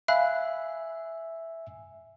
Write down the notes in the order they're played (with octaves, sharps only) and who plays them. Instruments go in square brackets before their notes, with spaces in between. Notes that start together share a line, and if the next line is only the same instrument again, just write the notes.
[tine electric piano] E5 G#5 [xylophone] F5 B5 F#6